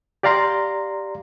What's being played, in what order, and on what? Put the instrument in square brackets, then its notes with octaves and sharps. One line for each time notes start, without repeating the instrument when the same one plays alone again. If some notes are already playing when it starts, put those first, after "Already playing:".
[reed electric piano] G4 D5 F5 A#5 C6